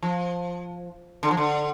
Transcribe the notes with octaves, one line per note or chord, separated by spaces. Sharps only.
F3
D3
F3
D3